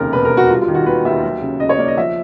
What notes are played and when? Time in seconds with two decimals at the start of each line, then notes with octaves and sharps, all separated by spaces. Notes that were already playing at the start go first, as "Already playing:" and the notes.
Already playing: F1 D#2 C#3 A#4
0.12 E1 B4
0.25 A#4
0.31 E1
0.37 F#4
0.50 G3 F4
0.62 F4
0.68 D#3
0.74 F#4
0.86 D#2 B4
1.05 D#2 E5
1.23 F#3
1.42 C#3
1.60 C#2 D#5
1.69 C#5
1.78 A#3 D5
1.88 D#5
1.97 F3 E5